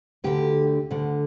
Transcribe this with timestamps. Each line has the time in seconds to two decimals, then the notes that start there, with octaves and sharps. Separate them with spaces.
0.24 D2 D3 G4
0.91 D2 D3